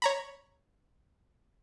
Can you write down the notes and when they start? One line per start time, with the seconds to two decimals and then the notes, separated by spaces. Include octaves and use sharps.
0.02 C#5 A#5 B5